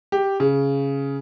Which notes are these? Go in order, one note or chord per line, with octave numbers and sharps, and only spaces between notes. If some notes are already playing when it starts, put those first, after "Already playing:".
G4
C#3